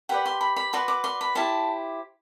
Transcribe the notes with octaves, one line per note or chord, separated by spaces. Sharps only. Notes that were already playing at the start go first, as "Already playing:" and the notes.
G4 B4 D5 F#5
C6
B5
B5
F#4 B4 D5 C6
D6
C6
B5
E4 G4 C5 A5